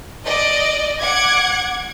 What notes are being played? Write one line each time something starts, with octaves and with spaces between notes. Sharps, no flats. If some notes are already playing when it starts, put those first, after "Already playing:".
D5 D#5
F#5 D6 G#6